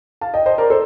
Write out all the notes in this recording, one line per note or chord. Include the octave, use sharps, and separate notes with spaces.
F5 A5
D#5 G5
C5 D#5
A#4 D5
A4 C5